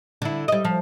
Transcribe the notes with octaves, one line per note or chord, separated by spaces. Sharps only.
D3 E4
G3 D#5
F3